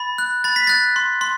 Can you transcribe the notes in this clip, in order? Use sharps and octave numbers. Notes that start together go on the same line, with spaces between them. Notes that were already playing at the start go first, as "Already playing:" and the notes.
Already playing: B5 A6
F#6
B5 A6
B6
F#6 A6
C6
C6